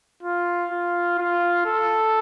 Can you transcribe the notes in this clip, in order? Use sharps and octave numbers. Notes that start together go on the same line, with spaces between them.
F4
F4
F4
A4